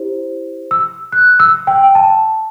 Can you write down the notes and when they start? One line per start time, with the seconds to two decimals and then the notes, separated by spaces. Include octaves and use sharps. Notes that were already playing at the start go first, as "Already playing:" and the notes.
Already playing: E4 G4 C5
0.71 E6
1.12 F#6
1.40 E6
1.67 G5
1.95 A5